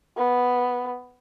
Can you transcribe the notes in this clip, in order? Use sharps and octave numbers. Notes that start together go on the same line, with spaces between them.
B3